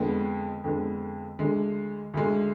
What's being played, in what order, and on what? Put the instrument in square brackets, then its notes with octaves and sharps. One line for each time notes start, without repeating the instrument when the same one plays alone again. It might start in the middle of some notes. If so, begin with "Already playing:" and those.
Already playing: [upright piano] F2 D3 G#3 B3
F2 D3 G#3 B3
D2 D3 G#3
D2 D3 G#3